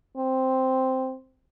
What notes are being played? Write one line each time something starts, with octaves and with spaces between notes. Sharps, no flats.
C4